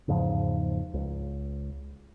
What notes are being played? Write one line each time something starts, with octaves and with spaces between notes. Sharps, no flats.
E2 G#2 C#3 F3
C#2